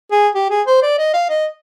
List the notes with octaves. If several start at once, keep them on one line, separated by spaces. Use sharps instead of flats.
G#4
G4
G#4
C5
D5
D#5
F5
D#5